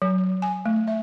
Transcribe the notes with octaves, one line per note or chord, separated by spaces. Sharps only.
F#3
G#5
A3
E5